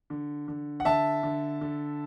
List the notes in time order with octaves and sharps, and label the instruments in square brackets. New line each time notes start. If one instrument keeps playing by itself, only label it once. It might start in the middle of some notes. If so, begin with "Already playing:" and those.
[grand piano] D3
D3
F#5
D3 E5 A5
D3
D3